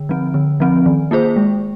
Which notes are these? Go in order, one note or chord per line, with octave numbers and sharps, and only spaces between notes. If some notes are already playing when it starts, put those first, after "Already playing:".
Already playing: D3
F3 C4
D3
F3 C4
D#3
A#3 F4 G#4 C5
G#3